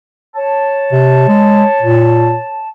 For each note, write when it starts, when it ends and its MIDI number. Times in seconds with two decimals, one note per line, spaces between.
0.36 2.69 73
0.36 2.69 81
0.92 1.26 48
1.28 1.64 56
1.82 2.37 46